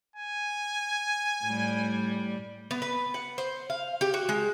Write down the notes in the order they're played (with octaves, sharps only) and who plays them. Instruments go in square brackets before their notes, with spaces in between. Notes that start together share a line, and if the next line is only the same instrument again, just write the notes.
[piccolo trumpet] G#5
[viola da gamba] A2 G3
[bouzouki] B3
B4
F#5
C5
F5
G4
F#4
G#3